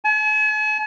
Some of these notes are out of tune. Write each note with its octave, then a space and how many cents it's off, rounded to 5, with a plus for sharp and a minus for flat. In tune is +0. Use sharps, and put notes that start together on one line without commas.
G#5 +45